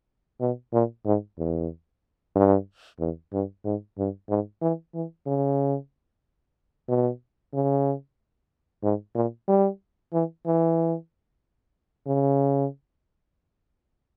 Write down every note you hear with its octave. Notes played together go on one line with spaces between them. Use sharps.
B2
A#2
G#2
E2
G2
E2
G2
G#2
G2
G#2
E3
E3
C#3
B2
C#3
G#2
A#2
G3
E3
E3
C#3